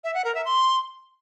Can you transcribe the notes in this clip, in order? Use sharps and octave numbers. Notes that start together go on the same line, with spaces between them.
E5
F#5
A#4
E5
C6